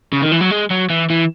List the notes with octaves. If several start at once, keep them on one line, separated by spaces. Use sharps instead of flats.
C#3
D#3
E3
F#3
G#3
F#3
E3
E3